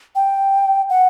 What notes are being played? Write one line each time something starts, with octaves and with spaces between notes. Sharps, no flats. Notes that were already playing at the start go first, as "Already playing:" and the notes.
G5
F#5